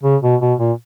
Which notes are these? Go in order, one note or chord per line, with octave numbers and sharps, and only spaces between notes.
C#3
B2
B2
A#2